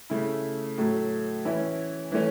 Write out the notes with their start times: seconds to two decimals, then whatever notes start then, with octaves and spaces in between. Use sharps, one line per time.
0.10 C#3 A3 E4
0.78 A2 F#3 A3
1.45 E3 C#4 E4
2.12 E3 A3 C#4